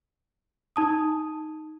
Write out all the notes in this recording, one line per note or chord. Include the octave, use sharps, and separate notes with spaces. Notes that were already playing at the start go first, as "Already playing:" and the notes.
D#4 A5 D#6